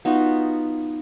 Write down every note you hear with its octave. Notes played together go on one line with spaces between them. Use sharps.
B3 D#4 F4 F#4